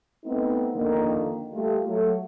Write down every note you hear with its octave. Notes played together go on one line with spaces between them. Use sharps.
A3 B3 C4 D#4
F2 D3 D#3 A#3
G3 A3 F4
F#3 A3